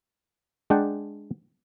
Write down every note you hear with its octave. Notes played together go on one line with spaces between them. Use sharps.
G#3 D4 D5 F#5 G5 A5